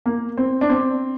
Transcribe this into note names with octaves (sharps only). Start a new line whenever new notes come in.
A#3
C4
D4
C4